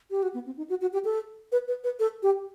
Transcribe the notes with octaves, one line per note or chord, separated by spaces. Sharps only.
G4
F#4
B3
C4
D#4
F#4
F#4
G4
A4
B4
B4
B4
A4
G4